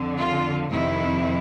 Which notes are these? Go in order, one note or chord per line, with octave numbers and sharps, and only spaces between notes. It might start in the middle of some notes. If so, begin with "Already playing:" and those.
Already playing: F2 D3
F4
F2 C3 D#3 E4